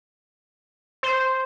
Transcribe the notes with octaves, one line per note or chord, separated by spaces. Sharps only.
C5